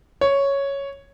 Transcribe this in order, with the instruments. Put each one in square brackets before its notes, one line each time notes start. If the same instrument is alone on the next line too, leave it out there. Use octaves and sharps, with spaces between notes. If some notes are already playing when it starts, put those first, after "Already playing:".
[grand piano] C#5